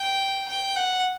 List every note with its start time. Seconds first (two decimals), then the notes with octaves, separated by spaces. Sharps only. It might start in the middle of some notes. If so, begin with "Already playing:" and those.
Already playing: G5
0.48 G5
0.76 F#5